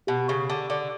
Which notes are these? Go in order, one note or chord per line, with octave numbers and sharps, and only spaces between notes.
B2 G4
C#3 C#6
D3 A5
D3 D5